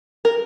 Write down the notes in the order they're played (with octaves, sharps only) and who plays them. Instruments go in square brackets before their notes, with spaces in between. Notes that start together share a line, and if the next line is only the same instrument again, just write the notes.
[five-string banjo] A#4